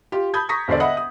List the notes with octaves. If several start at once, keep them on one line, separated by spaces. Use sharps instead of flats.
F4 G4
A5 B5 D#6 G6 G#6
A#5 C#6 D#6 A#6 B6
E1 D3 A4 C5 D5
D#5 E5 F#5 B5 D#6
D#6